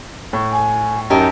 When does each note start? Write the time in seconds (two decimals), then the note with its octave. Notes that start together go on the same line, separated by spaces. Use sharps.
0.33 A2
0.52 G#5
1.10 F#2 D#4 G4 A#4 A5